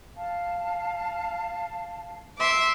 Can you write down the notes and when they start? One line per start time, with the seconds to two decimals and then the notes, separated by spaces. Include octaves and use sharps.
0.16 F5 A5
2.38 E5 C6 D6